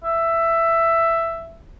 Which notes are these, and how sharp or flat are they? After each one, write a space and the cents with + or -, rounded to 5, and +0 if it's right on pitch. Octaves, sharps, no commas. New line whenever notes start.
E5 +10